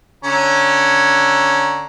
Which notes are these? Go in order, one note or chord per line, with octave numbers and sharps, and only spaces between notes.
D3 C#4 A#5